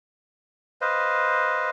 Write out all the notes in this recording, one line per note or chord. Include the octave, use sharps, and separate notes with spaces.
B4 C5 D#5 F5